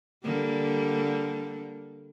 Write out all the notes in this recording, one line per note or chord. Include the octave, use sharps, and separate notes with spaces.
D3 G3 A#3